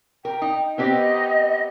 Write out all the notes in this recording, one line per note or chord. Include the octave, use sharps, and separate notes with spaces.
A#4 G5
D#4
B3 C4 G4 D#5